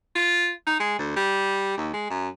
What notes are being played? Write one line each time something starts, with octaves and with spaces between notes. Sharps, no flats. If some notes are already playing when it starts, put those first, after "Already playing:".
F4
D#4
G#3
D2
G3
D#2
G#3
F#2